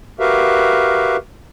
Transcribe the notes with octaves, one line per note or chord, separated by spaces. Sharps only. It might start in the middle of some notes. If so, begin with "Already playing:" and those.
F#4 G4 A#4 B4 E5 F5